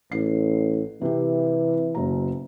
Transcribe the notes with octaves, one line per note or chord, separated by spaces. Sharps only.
A1 C7
C3 E3 G4
F#1 B2 A#5